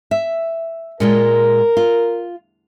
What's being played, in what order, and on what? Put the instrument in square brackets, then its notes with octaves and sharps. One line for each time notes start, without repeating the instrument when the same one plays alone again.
[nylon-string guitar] E5
[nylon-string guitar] A#2 G#3 F4 [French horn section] A#4
[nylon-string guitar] F4